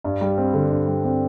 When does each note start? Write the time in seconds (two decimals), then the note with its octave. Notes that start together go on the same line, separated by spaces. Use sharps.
0.04 G2
0.21 G3
0.38 C4
0.53 D3
0.71 G2
0.88 G3
1.04 C4